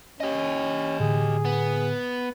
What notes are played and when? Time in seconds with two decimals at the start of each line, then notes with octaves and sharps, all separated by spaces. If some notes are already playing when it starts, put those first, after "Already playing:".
0.21 C#4 G4 D#5
1.00 A2 D3 G#4
1.45 B3